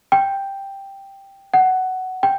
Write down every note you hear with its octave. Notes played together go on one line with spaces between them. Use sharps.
G5
F#5
G5